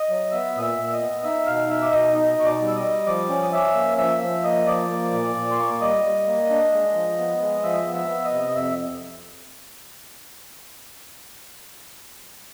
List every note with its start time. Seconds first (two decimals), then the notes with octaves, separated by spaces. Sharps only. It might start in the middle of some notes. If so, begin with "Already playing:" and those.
Already playing: D#5 D#6
0.09 F#3
0.32 B3 E5 E6
0.56 A#2 D#6
0.62 E5 E6
0.78 A#2
0.88 E6
0.93 D#5 D#6
1.01 B3
1.24 D#4 E5 E6
1.46 B2 F5 F6
1.69 D#4 E5 E6
1.82 D6
1.92 B2 D#5 D#6
2.15 D#4 D#5 D#6
2.38 B2 C#6
2.45 D5 D6
2.61 G3
2.68 E6
2.76 D#5 D#6
2.84 G3
3.07 F3 D5 D6
3.30 C#4
3.43 D#6
3.52 C#4 E5 E6
3.75 A#3
3.98 F3 E5 E6
4.21 F3 E5 E6
4.44 A#3 D#5 D#6
4.66 F3 D5 D6
4.89 A#3
5.13 A#2
5.36 A#2
5.51 C6
5.58 A#3 C#6
5.71 D6
5.81 G3 D#5 D#6
6.04 G3
6.26 A#3
6.50 D4
6.73 G#3
6.95 F3
7.19 B3
7.41 G#3
7.64 F3 E5 E6
7.86 B3
7.94 E5 E6
8.10 B3
8.25 D#5 D#6
8.32 C3
8.49 D#6
8.55 F2 E5 E6